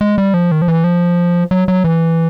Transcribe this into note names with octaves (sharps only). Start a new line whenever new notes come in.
G#3
G3
F3
D#3
F3
E3
F3
F#3
F#3
E3